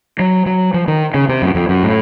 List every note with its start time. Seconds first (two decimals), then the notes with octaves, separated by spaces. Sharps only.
0.19 F#3
0.46 F#3
0.74 F3
0.88 D#3
1.14 C#3
1.29 C3
1.42 F#2
1.55 F2
1.69 F#2
1.83 A2